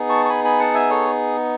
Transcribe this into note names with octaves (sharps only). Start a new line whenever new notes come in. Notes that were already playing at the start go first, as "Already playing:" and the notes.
Already playing: B3 D#4 G#4
A5 C#6
C#6
G#5 B5
G#5 B5
F#5 A5
E5 G#5
A4 C#5